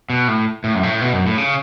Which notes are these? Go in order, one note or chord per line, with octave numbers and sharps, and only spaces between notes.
B2
A2
A2
F#2
A2
B2
F#2
A2
C#3